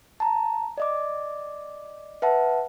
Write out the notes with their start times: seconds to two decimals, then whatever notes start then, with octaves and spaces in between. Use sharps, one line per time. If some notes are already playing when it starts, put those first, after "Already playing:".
0.20 A5 A#5
0.78 D5 D#5 D6
2.22 B4 E5 F#5 A5